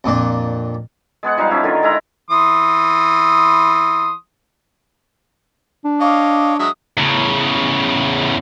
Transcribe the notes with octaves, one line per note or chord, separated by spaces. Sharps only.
F2 A#2 D4
G#3 B3 G#4 F#5
F3 G3 D#4 F5
F3 C#4 E4
D3 D#3 F4 A#4
G#3 E4 A#5
E3 C6 D#6
D4
C#5 D#5 F5 D6
F#3 G#3 E5 D#6
E2 C#3